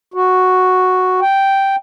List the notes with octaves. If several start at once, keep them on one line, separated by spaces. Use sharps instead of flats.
F#4
G5